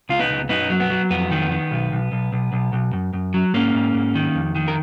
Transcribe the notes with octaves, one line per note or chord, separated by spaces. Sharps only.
C#2 F4
B3 D#4
C#2
F#2 B3 D#4
F#3
B3
F#3
F2 B3
D#3
D#3
B1
B1
B1
B1
B1
B1
F#2
F#2
F#3
G#2 A#3 C#4
G#2
G#2
D#3
F2
D#3
A#4